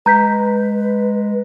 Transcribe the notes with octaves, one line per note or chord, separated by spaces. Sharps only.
G#3 B4 A#5 G6 B6